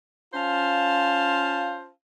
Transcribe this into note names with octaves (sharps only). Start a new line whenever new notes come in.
C#4 F4 C5 F5 A5